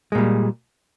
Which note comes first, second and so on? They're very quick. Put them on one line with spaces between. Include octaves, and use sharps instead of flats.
G#3 A#2 G3